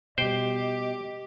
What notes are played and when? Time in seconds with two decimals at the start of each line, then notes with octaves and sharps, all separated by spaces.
0.18 B2 G3 G4 C5 D#5 G5